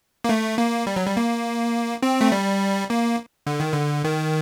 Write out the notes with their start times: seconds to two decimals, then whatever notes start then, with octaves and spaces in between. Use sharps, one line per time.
0.24 A#3
0.29 A3
0.58 A#3
0.87 G3
0.96 F#3
1.07 G3
1.17 A#3
2.03 C4
2.21 A3
2.32 G3
2.90 A#3
3.47 D3
3.60 D#3
3.73 D3
4.04 D#3